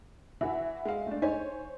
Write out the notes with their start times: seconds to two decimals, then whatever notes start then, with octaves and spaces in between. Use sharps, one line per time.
0.41 E3 F#4 E5
0.85 G#3 F5
1.07 A3 D4
1.22 D#4 C5 C#5 G#5